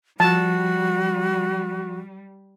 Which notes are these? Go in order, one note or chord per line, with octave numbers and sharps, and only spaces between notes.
F3 G3 F#4 A5